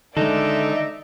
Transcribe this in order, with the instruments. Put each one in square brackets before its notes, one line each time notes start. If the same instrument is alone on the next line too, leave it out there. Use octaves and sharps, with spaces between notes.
[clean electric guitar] D3 A4 [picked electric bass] D#3 G#3 [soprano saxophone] D#4 [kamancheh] D5 E5